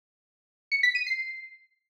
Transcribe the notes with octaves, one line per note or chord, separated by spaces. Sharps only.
C#7
B6
D#7
C7